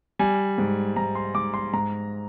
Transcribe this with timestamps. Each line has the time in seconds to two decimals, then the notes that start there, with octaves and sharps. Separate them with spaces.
0.19 G3 G#5
0.58 G#2
0.96 G#2 A#5
1.15 C6
1.35 G#2 D6
1.54 C6
1.73 G#2 A#5